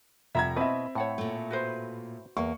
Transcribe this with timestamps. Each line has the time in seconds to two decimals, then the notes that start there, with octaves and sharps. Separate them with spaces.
0.35 F1 E5 A#5 G#6
0.56 B2 C4 E4 B4 D#5 E5
0.95 A2 C#5 F#5 G5
1.18 A#2 A3
1.51 F#4 B4 C5
2.37 E2 A#3 C#6